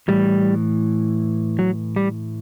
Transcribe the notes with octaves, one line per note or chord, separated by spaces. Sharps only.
A2 E3 G3
F#3
G3